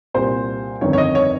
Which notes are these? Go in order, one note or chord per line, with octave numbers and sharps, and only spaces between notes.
C2 A#2 G3 C5
G1 F2 D#3 C#5
C#5
D#5
C#5